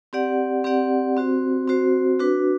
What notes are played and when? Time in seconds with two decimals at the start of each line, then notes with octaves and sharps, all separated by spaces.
0.13 C4 G4 D5 F#5
0.64 C4 G4 D5 F#5
1.17 C4 F#4 C5
1.68 C4 F#4 C5
2.19 D4 F#4 B4